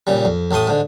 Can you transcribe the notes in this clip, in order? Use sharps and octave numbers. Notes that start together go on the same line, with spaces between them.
A#2 C#3 G3
F2
A1 A2 A3 C6 D#6
G#2 D3